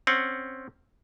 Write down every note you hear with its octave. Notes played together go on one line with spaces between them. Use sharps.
C4 C#4 F#5